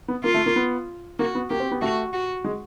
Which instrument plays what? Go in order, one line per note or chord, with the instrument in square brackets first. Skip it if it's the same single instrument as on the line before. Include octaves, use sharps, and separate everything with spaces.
[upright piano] B3
[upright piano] A#3 [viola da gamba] F4
[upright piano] A3
A#3
B3
[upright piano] A#3 [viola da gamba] F#4
[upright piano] B3
[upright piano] A#3 [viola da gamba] G4
[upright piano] C4
B3
[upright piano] A3 [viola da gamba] F#4
[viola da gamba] F#4
[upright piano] G#3